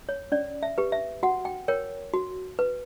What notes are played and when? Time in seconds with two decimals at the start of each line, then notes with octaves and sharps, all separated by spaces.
0.09 C#5
0.32 C#4 D5
0.63 E5
0.78 G4 B4
0.92 E5
1.23 F#4 F#5
1.45 G5
1.68 A#4 C#5 G5
2.14 F#4
2.59 B4